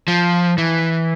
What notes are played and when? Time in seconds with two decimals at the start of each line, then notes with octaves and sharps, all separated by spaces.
0.08 F3
0.58 E3